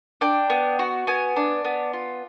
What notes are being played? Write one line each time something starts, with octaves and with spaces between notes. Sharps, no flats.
D4 G5
B3
F#4
B3 G#5
D4
B3
F4